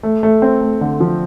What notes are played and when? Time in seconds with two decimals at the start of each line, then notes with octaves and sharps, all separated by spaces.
0.03 A3
0.23 A3
0.42 C4
0.61 A3
0.81 D3
1.00 F3